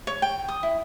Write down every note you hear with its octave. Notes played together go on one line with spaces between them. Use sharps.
C#5
G5
D#6
E4